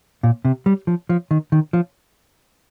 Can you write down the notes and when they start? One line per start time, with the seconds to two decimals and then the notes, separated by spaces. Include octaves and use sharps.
0.23 A#2
0.45 C3
0.66 G3
0.87 F3
1.09 F3
1.31 D#3
1.52 D#3
1.73 F3